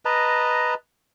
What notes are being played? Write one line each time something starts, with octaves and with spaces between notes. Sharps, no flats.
B4 D#5 A5 A#5